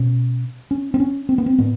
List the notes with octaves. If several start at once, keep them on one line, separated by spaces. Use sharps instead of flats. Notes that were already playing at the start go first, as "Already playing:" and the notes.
Already playing: B2 C#4
C#4
C4
C#4
C4
B3
C4
A2 B3